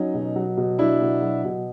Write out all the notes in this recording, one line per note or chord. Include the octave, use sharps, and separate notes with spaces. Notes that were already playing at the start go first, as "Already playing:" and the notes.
Already playing: F#3 C#4 D#4
B2
F#3
B2
F#3 D4 E4
B2
F#3
B2